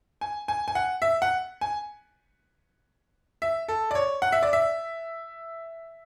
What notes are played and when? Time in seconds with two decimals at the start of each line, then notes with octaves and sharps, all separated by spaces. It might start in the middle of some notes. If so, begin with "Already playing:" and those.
0.21 G#5
0.48 G#5
0.68 G#5
0.75 F#5
1.02 E5
1.22 F#5
1.61 G#5
3.42 E5
3.68 A4
3.91 D5
3.95 C#5
4.22 F#5
4.32 E5
4.43 D5
4.53 E5